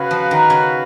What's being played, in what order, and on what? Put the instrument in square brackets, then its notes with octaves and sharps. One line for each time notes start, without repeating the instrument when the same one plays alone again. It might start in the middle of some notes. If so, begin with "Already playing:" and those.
Already playing: [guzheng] C#3 [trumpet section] F#4 B4 F5
[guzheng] F3
D#3
C#3